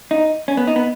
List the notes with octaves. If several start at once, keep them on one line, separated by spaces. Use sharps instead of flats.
D#4
C#4
B3
D#4
B3